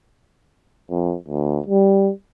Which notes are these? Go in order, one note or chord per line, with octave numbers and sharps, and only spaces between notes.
F2
D2
G3